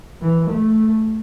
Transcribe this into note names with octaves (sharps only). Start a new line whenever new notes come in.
E3
A3